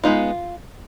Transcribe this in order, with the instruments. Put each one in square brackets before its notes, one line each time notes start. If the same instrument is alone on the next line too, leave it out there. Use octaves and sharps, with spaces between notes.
[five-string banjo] G#3 B3 D#4 F4